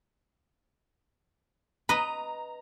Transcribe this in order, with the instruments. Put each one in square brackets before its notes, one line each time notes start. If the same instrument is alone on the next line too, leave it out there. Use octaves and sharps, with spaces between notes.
[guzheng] B4 D#5 [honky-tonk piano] A#5